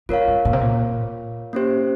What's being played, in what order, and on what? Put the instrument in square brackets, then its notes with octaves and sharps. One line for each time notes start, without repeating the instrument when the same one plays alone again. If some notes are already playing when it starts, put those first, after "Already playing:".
[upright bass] F2 [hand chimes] F4 A#4 C#5 F5
[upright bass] G2
A#2
C3
A#2
[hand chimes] A#3 C#4 G4 C5